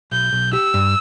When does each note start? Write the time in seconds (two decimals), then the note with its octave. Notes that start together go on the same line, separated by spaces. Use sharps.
0.12 B1 G6
0.33 B1
0.53 G4 E6
0.74 G2